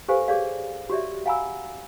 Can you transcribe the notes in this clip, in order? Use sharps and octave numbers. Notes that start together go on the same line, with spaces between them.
G4 A4 B4 C5 F5 G#5
G#4 C#5 D5 F5
F#4 G4 C#5 D5 E5
F5 F#5 G#5 A#5 B5 E6